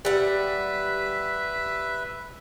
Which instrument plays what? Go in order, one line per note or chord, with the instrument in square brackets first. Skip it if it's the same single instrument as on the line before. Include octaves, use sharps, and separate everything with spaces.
[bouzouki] G3 F#5 [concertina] B4 E5